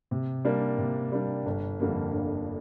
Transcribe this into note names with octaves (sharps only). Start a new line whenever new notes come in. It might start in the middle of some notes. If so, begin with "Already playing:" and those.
C3
G3 A#3 D4
C3
G3 A#3 D4
G1
F2 D3 G3 A#3
G1